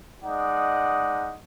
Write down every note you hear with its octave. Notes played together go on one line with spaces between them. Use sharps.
G#3 D#4 D5 F#5